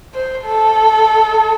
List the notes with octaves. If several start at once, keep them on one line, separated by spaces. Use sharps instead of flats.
C5
A4